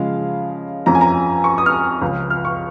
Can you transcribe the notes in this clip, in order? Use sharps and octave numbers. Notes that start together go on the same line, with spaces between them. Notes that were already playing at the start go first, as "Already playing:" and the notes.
Already playing: C#3 F3 G#3 F5
F2 F3 C#4 A#5
G#5
A#5
C#6
D#6
F6
D#6
C#2 C#3 F3
F6
C#6